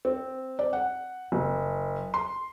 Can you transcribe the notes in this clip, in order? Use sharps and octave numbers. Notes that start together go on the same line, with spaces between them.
C4
D5
F#5
F#1
C6